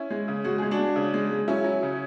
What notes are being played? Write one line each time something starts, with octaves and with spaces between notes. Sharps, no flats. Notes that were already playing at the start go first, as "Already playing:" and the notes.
Already playing: C#4 E4
G#3
C#3
G#3 F#4
G#3 G#4
D4 F#4
G#3
C#3
G#3
G#3
F#3 C#4 E4
F#3
C#3